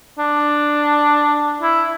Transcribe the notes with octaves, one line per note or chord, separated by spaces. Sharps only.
D4
E4